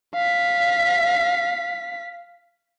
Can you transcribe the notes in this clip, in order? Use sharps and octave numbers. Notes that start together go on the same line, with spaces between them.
F5 B6